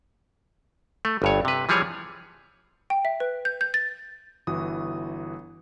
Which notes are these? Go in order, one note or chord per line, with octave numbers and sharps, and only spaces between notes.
A3
G1 G2 C#5
C3 B4
E3 F3 G3 G#4 C#5
G5
E5
B4
G6
G6
A6
G1 E3 F#4 D#6